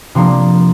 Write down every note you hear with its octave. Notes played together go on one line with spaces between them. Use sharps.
C3 F3 A#3 D4 C6